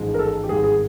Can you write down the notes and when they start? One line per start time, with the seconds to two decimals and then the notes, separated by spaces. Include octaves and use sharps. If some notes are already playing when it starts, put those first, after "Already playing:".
Already playing: A1 G#2 F3 G#3
0.14 A#4
0.19 A4
0.44 G4
0.49 G#1 G2 D#3 G#4
0.64 G#4